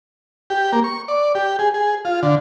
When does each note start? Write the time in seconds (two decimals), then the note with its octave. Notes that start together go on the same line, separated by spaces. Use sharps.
0.50 G4
0.72 A#3
0.84 C#6
1.08 D5
1.35 G4
1.59 G#4
1.74 G#4
2.05 F4
2.23 D3